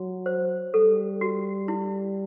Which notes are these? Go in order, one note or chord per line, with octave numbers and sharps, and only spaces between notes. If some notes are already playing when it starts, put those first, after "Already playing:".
Already playing: F#3 F#4
C5
G3 A4
F#4
E4